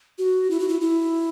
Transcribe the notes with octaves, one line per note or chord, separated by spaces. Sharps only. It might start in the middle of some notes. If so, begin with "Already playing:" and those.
F#4
E4
F#4
E4
E4